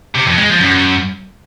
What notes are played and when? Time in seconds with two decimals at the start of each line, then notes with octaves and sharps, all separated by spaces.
0.15 C3
0.27 F2
0.38 G#3
0.50 F3
0.61 F#2